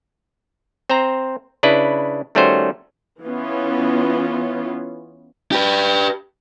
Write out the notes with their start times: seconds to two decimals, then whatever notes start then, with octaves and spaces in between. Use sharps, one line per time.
0.90 C4 C5 A#5
1.63 C#3 D4 E4 B4
2.35 D#3 G3 A3 C#4 F#4 C5
3.23 E3 B3 C#4 F4
5.52 G4 B4